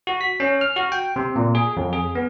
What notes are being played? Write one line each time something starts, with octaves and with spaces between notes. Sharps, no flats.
F#4
B6
C#4
F6
F#4
G5
C3
A#2
G#4
F2
G#4
B3